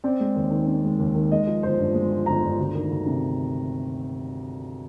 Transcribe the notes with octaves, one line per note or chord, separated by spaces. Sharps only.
C4 D5
G#3
D#2
D#3
C4
G#3
D#2
D#3
G#3 D#5
F3
G1 C5
G2
G#3
F3
G1 A#5
G2
D2
D#3
D2
C3